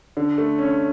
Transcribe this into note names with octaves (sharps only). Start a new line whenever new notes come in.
D3
A3
C#4